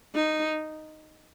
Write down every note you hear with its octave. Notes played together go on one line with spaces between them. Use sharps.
D#4